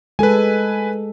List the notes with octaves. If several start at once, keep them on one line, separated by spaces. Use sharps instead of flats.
G#3 A4 B4 G#5